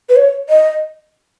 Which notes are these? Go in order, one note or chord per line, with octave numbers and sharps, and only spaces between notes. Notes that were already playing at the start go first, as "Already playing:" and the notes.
B4
C#5
D#5